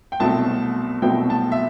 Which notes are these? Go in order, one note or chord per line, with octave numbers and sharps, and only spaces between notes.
G5
C2 B2 F#3 A3 C4 A5
C2 B2 F#3 A3 C4 G5
A5
E5